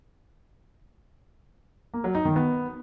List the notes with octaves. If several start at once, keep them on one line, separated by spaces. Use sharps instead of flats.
A#3
F#3
D#4
D#3
B3